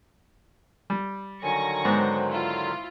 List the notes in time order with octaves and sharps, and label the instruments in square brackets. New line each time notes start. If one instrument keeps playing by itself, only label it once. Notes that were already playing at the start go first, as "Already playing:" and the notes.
[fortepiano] G3
[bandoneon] D3 D#3 F#3 [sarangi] G#5 [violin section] C#6 A#6
[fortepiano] G#2 B3 [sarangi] C5
[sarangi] E4 [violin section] F4